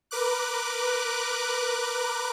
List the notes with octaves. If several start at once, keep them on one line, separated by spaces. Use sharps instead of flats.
A#4 B4 D6 F#6